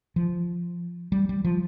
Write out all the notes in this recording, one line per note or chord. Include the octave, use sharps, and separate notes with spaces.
F3
G3
G3
F3